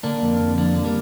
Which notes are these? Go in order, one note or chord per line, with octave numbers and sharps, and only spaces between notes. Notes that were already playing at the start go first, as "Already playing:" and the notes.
D3 A#3 D4
F2
F2
D3 A#3 D4
D3
G3 A#3